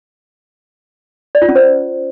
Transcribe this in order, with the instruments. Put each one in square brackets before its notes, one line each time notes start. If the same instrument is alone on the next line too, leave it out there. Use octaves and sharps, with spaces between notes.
[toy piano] D5
F4
C#4
C5